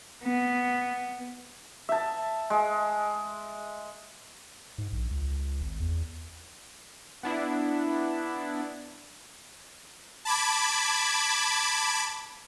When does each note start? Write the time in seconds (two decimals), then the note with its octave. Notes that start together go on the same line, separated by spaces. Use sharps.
0.23 B3
1.89 E5 A5
2.50 G#3
4.78 G#2
4.92 A#1
5.11 C#2
5.61 G#1
5.80 E2
7.23 B3 D4 E4
10.25 A5 B5 D6 G#6